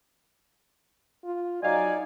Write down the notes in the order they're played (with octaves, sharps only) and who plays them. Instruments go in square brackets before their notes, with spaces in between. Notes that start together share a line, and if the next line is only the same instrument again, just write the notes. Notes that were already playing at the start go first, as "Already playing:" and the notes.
[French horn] F4
[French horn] F#3 [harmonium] D#4 D5 [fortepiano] D#5 F5 [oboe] G#5